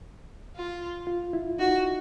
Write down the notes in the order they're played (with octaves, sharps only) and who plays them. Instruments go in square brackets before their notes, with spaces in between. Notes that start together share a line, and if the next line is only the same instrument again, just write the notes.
[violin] F4
[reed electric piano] F4
E4
[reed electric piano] D#4 [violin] F#4